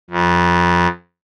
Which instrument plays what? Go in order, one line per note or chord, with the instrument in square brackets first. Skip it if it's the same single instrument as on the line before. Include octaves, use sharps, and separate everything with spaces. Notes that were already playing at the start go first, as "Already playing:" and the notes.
[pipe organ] F2